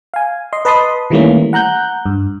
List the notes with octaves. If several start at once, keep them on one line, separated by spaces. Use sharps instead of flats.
F5 G#5
D#5 C6
B4 D#5 A5 B5 C6 D#6
D#3 E3 G3 A3 A#3 C#4
F#5 A#5 F#6 G6
G2